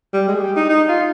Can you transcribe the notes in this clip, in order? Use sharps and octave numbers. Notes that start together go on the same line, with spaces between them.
G3
G#3
G#4
G4
D#4
D#4
F4